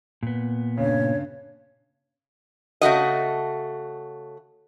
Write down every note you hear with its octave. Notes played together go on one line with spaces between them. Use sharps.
A#2 B3
G2 C#3 C#5
C#3 A3 F#4 D#5